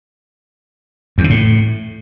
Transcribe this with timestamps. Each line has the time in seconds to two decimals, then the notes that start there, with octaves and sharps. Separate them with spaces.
1.18 E2
1.24 C3
1.30 A2